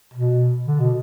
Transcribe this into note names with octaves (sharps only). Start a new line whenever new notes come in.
B2
D3
B2